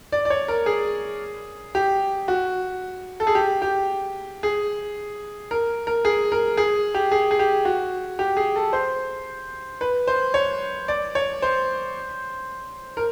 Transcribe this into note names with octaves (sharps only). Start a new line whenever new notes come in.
D5
D5
C#5
A#4
G#4
G4
F#4
A4
G#4
G4
G4
G#4
A#4
A#4
G#4
A#4
G#4
G4
G#4
G#4
G4
F#4
G4
G#4
A4
C5
B4
C5
C#5
D5
C#5
C5
A#4